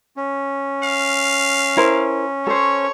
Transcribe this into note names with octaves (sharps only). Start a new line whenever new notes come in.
C#4
F5
E4 A#4 C5
A4 C5 C#5